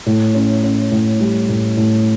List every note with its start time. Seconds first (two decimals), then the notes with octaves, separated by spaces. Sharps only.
0.06 A2
0.34 C#4
0.63 C#4
0.91 A2
1.20 G3
1.48 A2
1.77 A2